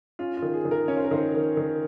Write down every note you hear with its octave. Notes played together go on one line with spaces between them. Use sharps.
C#4 F4
F4
D#3
G#4
D#3
A#4
C#4 C#5
C5
A#4
D#3 C5
D#3
D#3